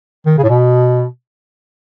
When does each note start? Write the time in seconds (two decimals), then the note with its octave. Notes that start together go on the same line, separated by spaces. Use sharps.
0.26 D#3
0.38 C#3
0.43 A2
0.49 B2